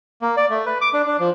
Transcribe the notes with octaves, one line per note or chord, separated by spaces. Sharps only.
A#3
D5
A3
B4
D6
D4
D4
F3